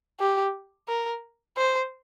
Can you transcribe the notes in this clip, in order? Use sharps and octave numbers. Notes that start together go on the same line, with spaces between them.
G4
A#4
C5